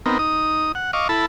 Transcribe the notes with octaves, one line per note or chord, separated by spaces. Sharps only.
B3 C4 D#4 A#4
D#4 D#6
F#5
D#5 F5 C#6 D6
E4 A4 A5 B5